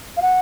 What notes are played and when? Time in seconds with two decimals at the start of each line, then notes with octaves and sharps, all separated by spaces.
0.17 F5
0.22 F#5